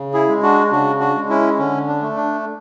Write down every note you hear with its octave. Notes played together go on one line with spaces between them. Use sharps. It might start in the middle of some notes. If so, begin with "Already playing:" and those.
Already playing: C#3
E4 G#4
G#3
D4 F#4
C#3 D4 F#4
D4 F#4
G#3
C#4 E4
D3 C#4
D4
A3
D4